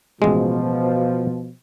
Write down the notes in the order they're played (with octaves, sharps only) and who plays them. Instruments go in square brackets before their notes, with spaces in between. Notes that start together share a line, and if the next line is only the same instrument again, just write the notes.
[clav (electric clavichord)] A1 G#3 [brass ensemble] B2 F3